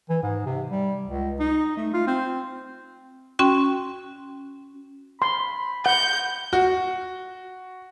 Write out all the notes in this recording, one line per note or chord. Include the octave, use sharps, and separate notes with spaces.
E3
G#2
C3
G3
C#2
D#4
A3
F4
C4
C#4 F#4 G5 C6
B5 C6
F#5 G6
F#4